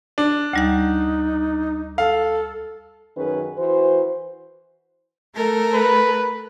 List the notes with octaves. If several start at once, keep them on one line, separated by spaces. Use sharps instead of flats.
D4
D2 G3 D#4 F#5
A4 F5
F#2 D#3 C#4 G#4 B4
E3 F#4 C5
A3 A4 A#4
B4